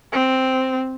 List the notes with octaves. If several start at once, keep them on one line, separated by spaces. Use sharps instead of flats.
C4